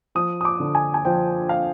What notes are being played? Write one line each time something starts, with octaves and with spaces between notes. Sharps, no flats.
F3 D#6
D#6
D6
D3
G#5
G#5
F3 G5
F5